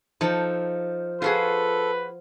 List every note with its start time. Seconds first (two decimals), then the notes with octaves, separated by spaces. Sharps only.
0.21 F3 D#4 A4
1.22 F4 F#4 G#4 A4 B4